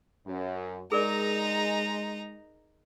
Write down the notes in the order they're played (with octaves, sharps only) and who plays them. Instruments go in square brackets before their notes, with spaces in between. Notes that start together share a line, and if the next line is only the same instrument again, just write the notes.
[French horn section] F#2
[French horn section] G#3 [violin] D#4 A#5 [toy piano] G#4 A#4 D5